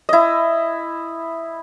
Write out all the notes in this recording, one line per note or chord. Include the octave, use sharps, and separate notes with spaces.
E4 D#5